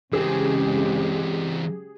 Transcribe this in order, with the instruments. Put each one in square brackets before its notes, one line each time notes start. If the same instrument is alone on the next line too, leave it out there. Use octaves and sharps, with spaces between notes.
[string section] C#3 G#3 [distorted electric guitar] E3 C4 [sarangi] G4 [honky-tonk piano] G#4